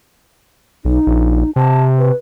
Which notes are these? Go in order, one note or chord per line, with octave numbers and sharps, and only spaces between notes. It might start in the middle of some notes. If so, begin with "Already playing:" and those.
B1 D#4
A#1
C3 A5
B4